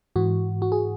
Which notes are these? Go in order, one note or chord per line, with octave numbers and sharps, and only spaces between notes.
G#2 E3 F#4
F#4
G#4